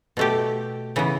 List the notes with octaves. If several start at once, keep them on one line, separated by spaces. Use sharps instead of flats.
B2 A3 G4
C#3 E3 B3